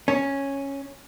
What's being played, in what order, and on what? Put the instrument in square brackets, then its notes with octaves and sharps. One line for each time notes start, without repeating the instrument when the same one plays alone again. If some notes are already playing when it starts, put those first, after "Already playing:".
[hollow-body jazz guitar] C#4